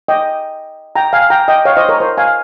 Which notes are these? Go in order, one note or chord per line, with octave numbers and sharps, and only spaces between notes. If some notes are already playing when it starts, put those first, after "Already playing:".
D#5 G5
G5 A#5
F5 G#5
G5 A#5
D#5 G5
C#5 F5
C5 D#5
A#4 C#5
C5
F5 G#5